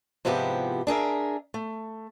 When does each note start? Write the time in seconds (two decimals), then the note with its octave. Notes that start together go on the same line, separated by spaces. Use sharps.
0.25 G#2 C3 F3 B3 E4 G4
0.87 D4 G#4 A#4 E5
1.54 A3